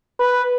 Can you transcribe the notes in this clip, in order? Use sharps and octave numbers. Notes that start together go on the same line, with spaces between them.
B4